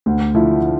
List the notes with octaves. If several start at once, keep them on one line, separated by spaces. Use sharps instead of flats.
D2
D3 F3 A3 E4